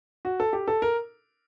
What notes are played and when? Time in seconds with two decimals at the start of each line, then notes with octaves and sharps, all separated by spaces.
0.25 F#4
0.40 A4
0.53 G4
0.68 A4
0.82 A#4